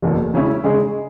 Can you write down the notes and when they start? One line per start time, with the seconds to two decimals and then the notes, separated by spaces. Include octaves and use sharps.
0.02 F#1 E2 B2 A3
0.34 C#3 G#3 C#4 E4
0.64 C#3 G#3 D#4 G#4